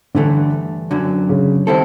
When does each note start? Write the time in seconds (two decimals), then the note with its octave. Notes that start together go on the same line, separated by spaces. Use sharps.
0.15 G2 D3 E3 A3
0.91 F#2 D3 F#3
1.29 C#3
1.67 D#3 G3 C4 E4 A4